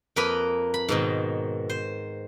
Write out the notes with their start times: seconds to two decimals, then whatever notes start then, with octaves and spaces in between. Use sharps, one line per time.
0.16 F2 A#3 A#4 B4 D#5 B5
0.74 B5
0.89 G#2 B2 D#3
1.70 C5